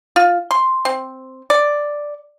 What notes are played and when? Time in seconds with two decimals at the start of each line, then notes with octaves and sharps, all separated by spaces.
0.16 F4
0.51 C6
0.85 C4
1.50 D5